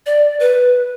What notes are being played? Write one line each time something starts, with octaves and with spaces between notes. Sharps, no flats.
D5
B4